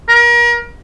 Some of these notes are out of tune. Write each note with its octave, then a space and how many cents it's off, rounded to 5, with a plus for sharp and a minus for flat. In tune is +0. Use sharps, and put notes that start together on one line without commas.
A#4 +35